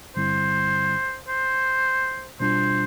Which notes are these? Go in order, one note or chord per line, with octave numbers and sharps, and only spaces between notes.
G2 D3 G3 C4 E4 C5
C5
B2 G3 D4 F4 C5